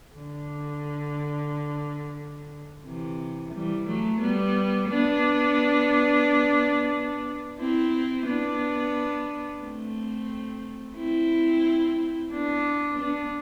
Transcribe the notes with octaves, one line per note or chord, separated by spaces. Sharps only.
D3
C3 E3
E3 G3
F#3 A3
G3 B3
B3 D4
C4 E4
B3 D4
A3 C4
C4 E4
B3 D4
B3 D4